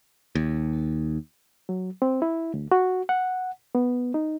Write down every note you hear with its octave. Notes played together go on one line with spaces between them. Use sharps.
D#2
F#3
C4
E4
D2
F#4
F#5
B3
D#4